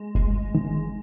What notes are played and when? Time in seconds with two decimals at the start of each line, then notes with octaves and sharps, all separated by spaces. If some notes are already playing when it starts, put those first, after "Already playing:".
Already playing: G#3
0.15 G1 G#3
0.55 D#3